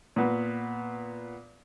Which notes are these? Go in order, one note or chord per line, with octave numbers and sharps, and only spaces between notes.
A#2 B3